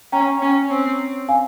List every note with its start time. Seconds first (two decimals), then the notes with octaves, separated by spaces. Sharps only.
0.12 C#4 G5 A#5
0.42 C#4
0.70 C4
1.29 F5 G#5